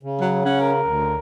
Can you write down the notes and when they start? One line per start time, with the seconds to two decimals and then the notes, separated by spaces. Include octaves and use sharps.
0.03 C#3
0.20 F#3
0.45 C#4 F#5
0.61 A#4
0.88 D2